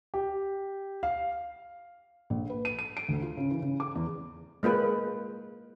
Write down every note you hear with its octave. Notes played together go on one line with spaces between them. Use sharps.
G4
F5
A#1
B4
D#7
D#7
D7
D2
F4
C#3
E3
C#3
D6
E2
G#3 A#3 F4 B4